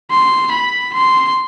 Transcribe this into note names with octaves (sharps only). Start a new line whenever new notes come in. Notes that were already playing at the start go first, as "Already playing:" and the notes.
C6
B5
C6